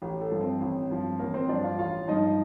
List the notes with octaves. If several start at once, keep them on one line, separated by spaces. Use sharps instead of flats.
A1 G4
A4
G2 F3
C4 C5
A1
G2 F3
A1 A#3 A#4
C4 C5
G2 F3 D4 D5
F4 F5
A1 F4 F5
G2 F3 D#4 D#5